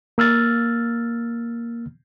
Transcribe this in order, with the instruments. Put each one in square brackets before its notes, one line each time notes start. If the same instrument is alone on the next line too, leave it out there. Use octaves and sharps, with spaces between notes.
[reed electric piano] A#3 E6 F6 A6